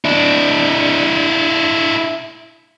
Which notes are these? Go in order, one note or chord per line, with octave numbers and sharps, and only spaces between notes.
D4 E4